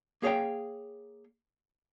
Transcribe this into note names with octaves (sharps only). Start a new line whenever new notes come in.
A#3 G#4 C#5 F5 G5